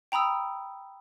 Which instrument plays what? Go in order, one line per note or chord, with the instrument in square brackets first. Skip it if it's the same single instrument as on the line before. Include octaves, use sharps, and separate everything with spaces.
[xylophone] G5 A#5 B5 D#6 E6